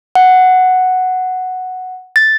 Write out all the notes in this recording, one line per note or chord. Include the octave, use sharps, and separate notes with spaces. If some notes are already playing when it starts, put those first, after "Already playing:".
F#5
A6